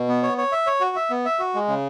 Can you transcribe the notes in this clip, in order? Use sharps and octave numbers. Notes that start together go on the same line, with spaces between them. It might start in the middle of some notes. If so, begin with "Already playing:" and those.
Already playing: B2
B3
C#5
C#5
E5
C#5
F#4
E5
B3
E5
F#4
G#3
C#3